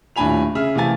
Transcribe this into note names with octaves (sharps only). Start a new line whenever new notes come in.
D#1 A2 D4 G#5 B5 F7
C#3 G#4 E5 F6
C3 E3 A3 F5 G#5 A6